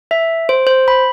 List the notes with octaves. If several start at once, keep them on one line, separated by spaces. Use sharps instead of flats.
E5
C5
C5
B5